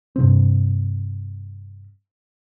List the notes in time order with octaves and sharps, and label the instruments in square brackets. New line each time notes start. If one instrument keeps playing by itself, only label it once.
[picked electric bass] G2 C3 C4